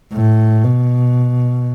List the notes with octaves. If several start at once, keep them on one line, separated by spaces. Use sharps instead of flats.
A2
B2